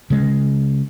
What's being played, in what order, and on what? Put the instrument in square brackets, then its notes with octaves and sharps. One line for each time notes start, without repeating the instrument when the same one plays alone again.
[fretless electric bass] C#3 G#3